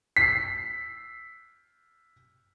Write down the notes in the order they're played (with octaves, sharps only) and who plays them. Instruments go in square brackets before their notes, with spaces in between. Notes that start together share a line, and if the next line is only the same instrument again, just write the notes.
[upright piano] B6 C7